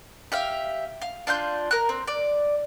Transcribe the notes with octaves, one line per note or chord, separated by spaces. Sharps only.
G4 E5 F5
F5
D4 F4 C6 G6
A#4 F#6
C4
D5